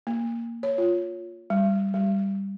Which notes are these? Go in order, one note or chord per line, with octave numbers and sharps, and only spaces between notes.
A#3
C#5
F4
G3
G3